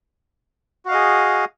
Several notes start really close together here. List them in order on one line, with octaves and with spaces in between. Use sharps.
F#4 F5 D#5 G#4